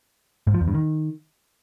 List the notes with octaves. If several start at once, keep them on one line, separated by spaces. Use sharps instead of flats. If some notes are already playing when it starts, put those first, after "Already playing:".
G#2
F3
E2
G2
D#3